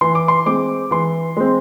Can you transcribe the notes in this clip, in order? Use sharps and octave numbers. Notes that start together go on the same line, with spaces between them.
E3 C6
D6
C6
G#3 C4 D6
E3 C6
G#3 C4